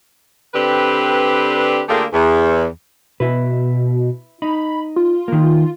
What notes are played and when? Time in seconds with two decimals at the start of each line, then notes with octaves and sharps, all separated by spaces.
0.55 D3 C4 D4 G4 B4
1.89 D3 A3 A#3 F4 G4 G#4
2.13 E2
3.20 B2 E4 B4
4.42 D#4 B5
4.96 F4
5.28 D#3 A#3